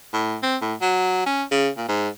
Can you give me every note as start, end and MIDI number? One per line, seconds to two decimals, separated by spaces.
0.13 0.36 45
0.43 0.57 60
0.62 0.74 45
0.81 1.26 54
1.26 1.44 61
1.51 1.69 49
1.77 1.86 46
1.89 2.09 44